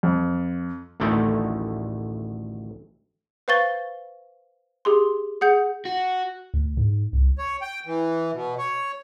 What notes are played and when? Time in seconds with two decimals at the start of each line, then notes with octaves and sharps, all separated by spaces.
0.03 F2
1.00 A1 D2 D3 D#3 A3 G5
3.48 B4 C5 F5 C#6 A6 G7
4.85 G4 G#4 C6
5.41 G#4 F#5 G6
5.85 F#4
6.54 D2
6.77 G#2
7.13 C2
7.38 C#5
7.62 G5
7.86 E3
8.34 B2
8.58 C#5